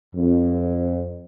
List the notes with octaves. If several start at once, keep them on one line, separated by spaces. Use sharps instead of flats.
F2